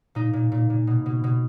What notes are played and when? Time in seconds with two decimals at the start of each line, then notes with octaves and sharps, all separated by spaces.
0.15 A#2 D#4
0.33 A#2
0.52 A#2
0.70 A#2
0.87 B2
1.06 B2
1.24 B2